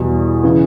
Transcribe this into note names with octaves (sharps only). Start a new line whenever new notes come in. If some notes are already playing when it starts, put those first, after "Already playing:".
Already playing: E2 B2 G3
C#3 E3